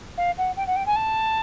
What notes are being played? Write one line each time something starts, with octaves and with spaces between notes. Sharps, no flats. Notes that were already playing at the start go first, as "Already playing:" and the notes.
F5
F#5
G5
F#5
G5
G#5
A5